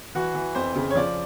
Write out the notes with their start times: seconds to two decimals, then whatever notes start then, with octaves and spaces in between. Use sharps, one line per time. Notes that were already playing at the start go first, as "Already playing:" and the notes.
0.15 E3 F#4
0.35 E3
0.55 F2 C5
0.76 C#3
0.90 C#5
0.96 F3 D5